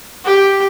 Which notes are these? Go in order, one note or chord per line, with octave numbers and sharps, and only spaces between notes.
G4